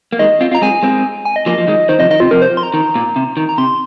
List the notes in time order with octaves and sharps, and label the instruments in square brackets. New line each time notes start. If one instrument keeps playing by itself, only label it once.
[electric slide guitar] A#3
[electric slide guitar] D#3 G#3 [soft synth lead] D#5
[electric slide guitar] C4 F4
C4 F4
[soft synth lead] A#5
[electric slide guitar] G#3 C4 [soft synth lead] G#5
[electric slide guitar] G#3 C4
[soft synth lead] G#5
D#5
[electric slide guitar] F3 A#3 [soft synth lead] D#5
[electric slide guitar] F3
D#3 G#3
[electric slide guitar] D#3 [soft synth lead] C5
[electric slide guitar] C3 F3 [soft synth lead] D#5
[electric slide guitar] D#3 [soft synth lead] D#5
[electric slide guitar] C3 [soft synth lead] F4
[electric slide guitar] C3 F3 [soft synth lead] A#4
[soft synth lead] C5
C6
A#5
[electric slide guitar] D#3
A#2
C3
D#3
[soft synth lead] A#5
[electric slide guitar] C3 [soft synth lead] C6